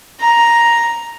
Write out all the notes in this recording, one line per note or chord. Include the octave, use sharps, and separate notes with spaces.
A#5